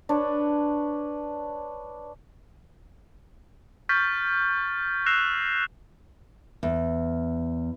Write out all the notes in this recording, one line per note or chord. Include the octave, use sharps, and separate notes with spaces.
D4 B4 C#5
C#6 F6 G6 A6 B6
E6 F#6 A#6 C7 E7 F7
E2